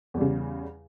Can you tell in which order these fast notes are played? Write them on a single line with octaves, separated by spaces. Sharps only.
E2 G3 C#3